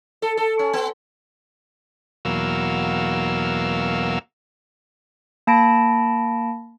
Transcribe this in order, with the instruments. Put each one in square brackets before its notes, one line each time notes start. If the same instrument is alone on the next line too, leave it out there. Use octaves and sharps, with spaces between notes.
[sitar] A4
A4
C#4
B3
[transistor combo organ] E2 B2 F#3 A#3 F5 E6
[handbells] A#3 A5 B5 A#6 D7